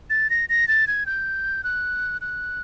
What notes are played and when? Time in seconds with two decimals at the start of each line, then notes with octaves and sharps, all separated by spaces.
0.10 A6
0.30 A#6
0.49 A#6
0.68 A6
0.87 G#6
1.06 G6
1.64 F#6
2.21 F#6